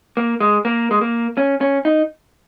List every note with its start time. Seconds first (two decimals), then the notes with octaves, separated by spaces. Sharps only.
0.17 A#3
0.40 G#3
0.65 A#3
0.91 G#3
1.01 A#3
1.37 C#4
1.61 C#4
1.85 D#4